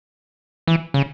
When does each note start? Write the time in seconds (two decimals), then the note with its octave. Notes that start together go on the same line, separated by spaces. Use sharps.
0.67 E3
0.94 C#3